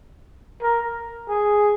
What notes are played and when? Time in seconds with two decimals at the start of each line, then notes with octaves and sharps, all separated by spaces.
0.62 A#4
1.29 G#4